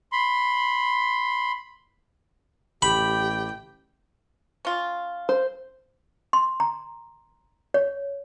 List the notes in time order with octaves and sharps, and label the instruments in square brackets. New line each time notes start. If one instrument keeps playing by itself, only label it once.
[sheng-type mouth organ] B5 C6
[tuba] A1 [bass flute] G4 [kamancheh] G5 [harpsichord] B5
[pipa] C#4 F4
[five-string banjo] C5
[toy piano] C6
A#5
C#5